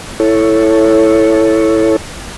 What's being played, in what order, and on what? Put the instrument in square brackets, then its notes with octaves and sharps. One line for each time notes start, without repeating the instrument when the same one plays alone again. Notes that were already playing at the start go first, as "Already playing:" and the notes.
[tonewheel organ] E4 A4 C#5